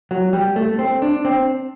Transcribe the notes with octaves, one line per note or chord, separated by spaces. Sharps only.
F#3
G3
A3
C4
D4
C4